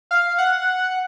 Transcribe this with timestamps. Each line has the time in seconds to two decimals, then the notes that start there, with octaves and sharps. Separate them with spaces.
0.11 F5
0.38 F#5